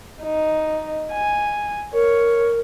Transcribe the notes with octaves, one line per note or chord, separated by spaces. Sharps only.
D#4
G#5
A#4 C#5